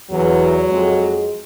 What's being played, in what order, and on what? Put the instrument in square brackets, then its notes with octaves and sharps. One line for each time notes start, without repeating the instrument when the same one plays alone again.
[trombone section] E2 [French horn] F#3
[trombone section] F2 G#3